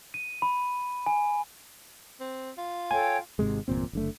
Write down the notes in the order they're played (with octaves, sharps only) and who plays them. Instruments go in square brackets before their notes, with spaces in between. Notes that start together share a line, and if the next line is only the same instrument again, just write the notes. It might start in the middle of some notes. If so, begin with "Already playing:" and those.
[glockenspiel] D#7
B5
G#5
[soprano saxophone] C4
F4
[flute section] A4 C#5 G5 [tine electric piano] G#5
[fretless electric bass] G#1 G#2 C3 G#3
G1 E2 A#2 C4
F#1 D3 A3